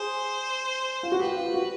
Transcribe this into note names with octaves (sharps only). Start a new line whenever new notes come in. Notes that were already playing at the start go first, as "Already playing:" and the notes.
Already playing: G#4 C5
F4
F#4
G4 B4
F4
F#4